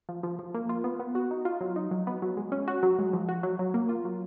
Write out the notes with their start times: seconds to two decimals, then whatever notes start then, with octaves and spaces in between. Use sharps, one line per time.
0.09 F3
0.23 F3
0.39 F3
0.54 A#3
0.69 F4
0.84 B3
1.00 B3
1.15 F#4
1.31 D#4
1.45 F4
1.61 F#3
1.76 D#4
1.91 F#3
2.07 B3
2.22 F#3
2.37 G#3
2.52 C#4
2.68 F#4
2.83 F#3
2.99 G#3
3.13 F3
3.29 F#4
3.43 F#3
3.59 F#3
3.74 A#3
3.89 F4
4.05 F#3